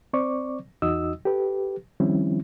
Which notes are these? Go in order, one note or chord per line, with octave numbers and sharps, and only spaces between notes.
C4 C5 D5 C#6 D6
E2 D#4 F#4 D#5 D#6 E6
G4 A4 B4
D#3 F3 G3 C4 C#4 E4